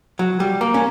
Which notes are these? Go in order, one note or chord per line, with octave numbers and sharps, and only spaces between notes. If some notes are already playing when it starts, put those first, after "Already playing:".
F#3
G3
A#3
C#4